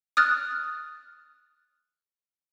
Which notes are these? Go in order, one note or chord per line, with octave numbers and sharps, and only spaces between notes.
D#6 F6 F#6 A6